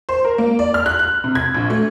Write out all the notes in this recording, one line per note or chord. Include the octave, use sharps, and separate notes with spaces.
C5
A#4
A#3
D5
F6
F#6
F#6
C3
G#6
A#1
A3